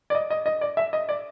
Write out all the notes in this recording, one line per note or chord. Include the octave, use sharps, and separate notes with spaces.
D5
D#5
D#5
D#5
D5
E5
D#5
D5